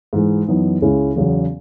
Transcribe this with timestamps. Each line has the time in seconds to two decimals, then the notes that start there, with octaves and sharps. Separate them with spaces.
0.13 G#2 E3 G#3
0.47 F#2 E3 B3 D#4
0.82 C#2 C#3 G#3 C#4 E4
1.16 E2 C#3 F#3